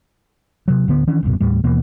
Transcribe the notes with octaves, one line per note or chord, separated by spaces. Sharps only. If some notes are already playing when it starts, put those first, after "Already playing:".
C3 F#3
D1 D3 B3
D#3 E3 C#4 D4
D#1 C2 F#2 B2
D#2 A2 G3
D#2 B2 E3 A#3